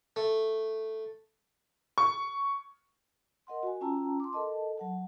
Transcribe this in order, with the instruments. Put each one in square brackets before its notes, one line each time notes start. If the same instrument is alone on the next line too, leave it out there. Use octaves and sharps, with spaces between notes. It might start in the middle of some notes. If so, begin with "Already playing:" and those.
[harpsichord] A3
[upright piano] C#6
[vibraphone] A#4 D#5 F#5 C6
F#4 G#5
C#4 F4 G5 A5 A#5 E6
C6 D6
A4 A#4 D#5 A5
F#3 F#5 A5